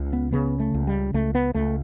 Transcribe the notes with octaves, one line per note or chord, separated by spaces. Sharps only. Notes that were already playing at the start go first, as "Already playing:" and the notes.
Already playing: C#2 C#3
B3
C#3 B3
A3
C#2
G3
C#2 A3
B3
C#2 A3